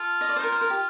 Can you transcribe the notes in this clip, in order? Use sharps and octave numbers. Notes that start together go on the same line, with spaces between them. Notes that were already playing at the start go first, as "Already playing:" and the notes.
Already playing: F4 A4
D#5
D5
D#4 C5
F4 A#4
C5
A#4
G4